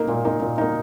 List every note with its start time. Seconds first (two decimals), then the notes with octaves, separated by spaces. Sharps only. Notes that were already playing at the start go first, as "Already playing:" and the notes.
Already playing: A#3 D#4
0.08 A#2
0.25 A#3 D#4
0.41 A#2
0.58 A#3 D#4